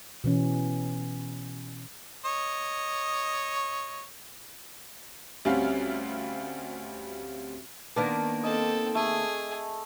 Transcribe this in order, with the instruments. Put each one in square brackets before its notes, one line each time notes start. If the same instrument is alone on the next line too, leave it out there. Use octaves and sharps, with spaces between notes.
[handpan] B2 E3 C#4
[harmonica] C#5 D#5
[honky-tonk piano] D2 G3 C4 C#4 F#4 F5
[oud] D#3 A#3 B3 [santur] D4
[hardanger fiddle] C4 A4 [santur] D#5
[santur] A3 [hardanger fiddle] G#4